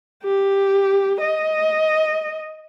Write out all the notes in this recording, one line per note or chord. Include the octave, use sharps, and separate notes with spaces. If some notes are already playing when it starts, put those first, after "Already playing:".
G4
D#5